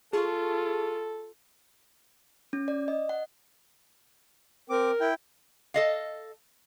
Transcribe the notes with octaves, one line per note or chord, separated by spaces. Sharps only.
F4 G#4 A4 A5 C#6
C#4
D5
D#5
F#5
C4 A#4 D6
E4 G5
A4 D#5 F5